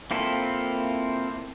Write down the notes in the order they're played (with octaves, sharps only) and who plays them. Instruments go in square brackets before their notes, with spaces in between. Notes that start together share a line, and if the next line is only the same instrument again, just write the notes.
[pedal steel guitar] A#3 C4 E4 F4 A4